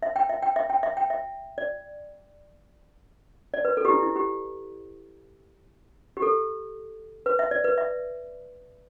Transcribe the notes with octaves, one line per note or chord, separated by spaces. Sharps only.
E5
G5
E5
G5
E5
G5
E5
G5
E5
D5
D5
B4
A4
G4
E4
E4
G4
G4
A4
B4
E5
D5
B4
E5